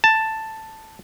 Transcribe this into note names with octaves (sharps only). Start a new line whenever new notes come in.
A5